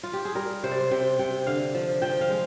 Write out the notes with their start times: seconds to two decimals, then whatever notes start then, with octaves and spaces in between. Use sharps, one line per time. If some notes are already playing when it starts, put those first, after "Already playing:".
0.03 F4
0.13 G4
0.25 G#4
0.35 G3 A#4
0.63 C3 C5
0.71 D5
0.80 C5
0.91 C3 G5
1.19 C3 G5
1.47 D3 F5
1.75 F3
2.02 F3 G5
2.21 F5
2.30 G#3